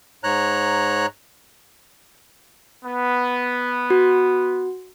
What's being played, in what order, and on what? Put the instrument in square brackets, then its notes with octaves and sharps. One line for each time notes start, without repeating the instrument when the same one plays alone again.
[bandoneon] G#2 C#5 A#5 F#6
[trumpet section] B3
[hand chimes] F#4